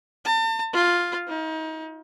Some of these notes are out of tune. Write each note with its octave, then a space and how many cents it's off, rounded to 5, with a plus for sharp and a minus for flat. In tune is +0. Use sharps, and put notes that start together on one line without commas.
A5 +40
F4 +5
D#4 +35